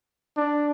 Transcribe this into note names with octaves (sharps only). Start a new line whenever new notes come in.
D4